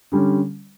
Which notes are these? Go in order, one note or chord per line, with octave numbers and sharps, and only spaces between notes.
D3 G3 C#4